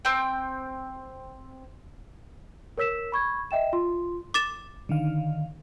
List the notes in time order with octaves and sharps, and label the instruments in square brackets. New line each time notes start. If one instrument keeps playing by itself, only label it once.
[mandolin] C4 G5
[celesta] A#4 C#5 E6 B6 E7
B5 C#6 G#6
D#5 E5 G5 E7
F4 C6
[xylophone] D6 A6 E7
[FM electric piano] D3 D#3 F5